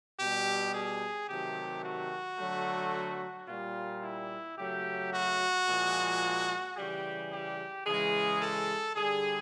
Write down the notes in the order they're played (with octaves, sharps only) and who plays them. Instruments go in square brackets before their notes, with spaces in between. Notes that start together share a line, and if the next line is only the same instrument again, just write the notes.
[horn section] B2 G3 G4
G#4
C3 D#3 F#3 A3 G4
F#4
D3 F#3 A3
A#2 G3 F4
E4
C#3 F#3 A3 G4
F#4
A#2 F3 G#3
C#3 E3 G3 G4
G4
C#3 E3 G#3 G#4
A4
D3 G3 G#4